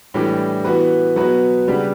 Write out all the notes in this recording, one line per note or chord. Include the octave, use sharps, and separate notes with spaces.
A2 E3 G3 D4 G4
E3 B3 F#4 B4
B2 F#3 B3 F#4 B4
C#3 G3 D4 G4 B4